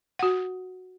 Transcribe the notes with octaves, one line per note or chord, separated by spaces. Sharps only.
F#4 F#5